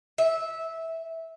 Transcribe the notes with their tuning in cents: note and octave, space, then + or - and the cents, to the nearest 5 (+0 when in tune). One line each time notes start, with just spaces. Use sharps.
E5 -15